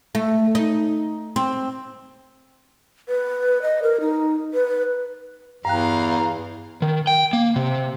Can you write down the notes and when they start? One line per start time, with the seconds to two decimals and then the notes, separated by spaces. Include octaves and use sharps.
0.15 A3
0.55 D#4
1.36 C4
3.08 B4
3.62 D#5
3.83 A#4
4.01 D#4
4.54 B4
5.65 E2 G2 F5 G5 A#5 F#6
6.82 D#3
7.07 G5
7.33 A#3
7.56 C3